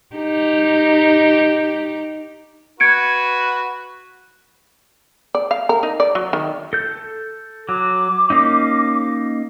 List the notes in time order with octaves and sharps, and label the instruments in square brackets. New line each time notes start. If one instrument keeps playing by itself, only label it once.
[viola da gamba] D#4 G4
[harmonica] F#4 B4 [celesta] G#6 C#7 D7
[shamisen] D5
F5
A#4
D#4
D5
F#3
D#3
[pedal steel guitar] A4 G6
[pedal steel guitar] F#3 [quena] D6
[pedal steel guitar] A#3 C#4 D#4